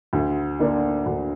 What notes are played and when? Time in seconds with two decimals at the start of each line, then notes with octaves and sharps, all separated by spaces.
0.13 D2
0.59 D3 A#3 D4
1.06 D2